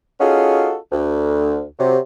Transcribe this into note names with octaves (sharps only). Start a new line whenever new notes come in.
C#4 D#4 F4 F#4 G#4 A4
D2
C3 F#3